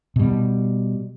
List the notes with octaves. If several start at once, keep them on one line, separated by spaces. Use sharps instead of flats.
B2 G3